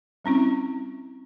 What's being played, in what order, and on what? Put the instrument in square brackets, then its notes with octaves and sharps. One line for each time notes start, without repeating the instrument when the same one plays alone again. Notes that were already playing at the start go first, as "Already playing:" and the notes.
[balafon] G3 C4 C#4 E4